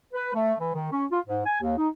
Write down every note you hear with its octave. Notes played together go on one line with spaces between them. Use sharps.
B4
A3
E3
D#3
C#4
F4
G#2
G#5
D#2
D#4